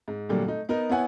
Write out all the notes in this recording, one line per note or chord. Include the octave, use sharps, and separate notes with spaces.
G#2
A#2 D3 F#3 G3 A3 A#3
A3 D#4
B3 D#4 A#4
B3 E4 C#5 F#5 G#5